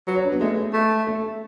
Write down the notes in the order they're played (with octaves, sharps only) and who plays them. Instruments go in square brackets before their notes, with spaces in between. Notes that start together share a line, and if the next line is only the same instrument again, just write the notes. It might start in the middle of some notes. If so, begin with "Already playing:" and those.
[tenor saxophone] F#3 [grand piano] B4
[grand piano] C#5
D4
B3
[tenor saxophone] G#3 [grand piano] A3
[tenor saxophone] A3
[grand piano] A3